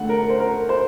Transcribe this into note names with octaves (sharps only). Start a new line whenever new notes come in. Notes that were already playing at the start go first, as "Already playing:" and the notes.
Already playing: D3 A3 F#5
A#4
C5
A#4
C5